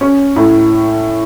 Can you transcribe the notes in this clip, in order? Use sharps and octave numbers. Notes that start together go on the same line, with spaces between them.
C#4
A2